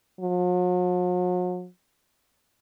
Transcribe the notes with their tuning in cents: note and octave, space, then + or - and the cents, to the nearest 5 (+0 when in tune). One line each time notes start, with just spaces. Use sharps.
F#3 -45